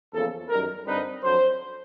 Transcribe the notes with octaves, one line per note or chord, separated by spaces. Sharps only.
E2 C#3 F3 A#3 A4
F#2 D#3 G3 A#4
G2 D3 G3 C4 D#4 B4
F2 D3 F#3 C5